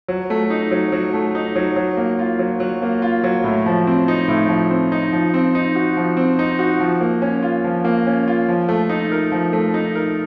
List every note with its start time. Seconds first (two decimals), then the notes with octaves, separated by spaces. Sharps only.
0.08 F#3
0.30 A3
0.50 D#4
0.71 F#3
0.92 F#3
1.13 A3
1.35 D#4
1.56 F#3
1.76 F#3
1.97 A#3
2.19 F4
2.39 F#3
2.60 F#3
2.82 A#3
3.02 F4
3.24 F#3
3.44 A2
3.66 F3
3.87 C4
4.08 D#4
4.28 A2
4.49 F3
4.70 C4
4.92 D#4
5.13 F3
5.34 C4
5.55 D#4
5.75 F#4
5.97 F3
6.17 C4
6.39 D#4
6.59 F#4
6.80 F3
7.01 A#3
7.22 C#4
7.43 F4
7.64 F3
7.85 A#3
8.07 C#4
8.28 F4
8.49 F3
8.69 A3
8.89 D#4
9.12 A#4
9.32 F3
9.53 A3
9.74 D#4
9.96 A#4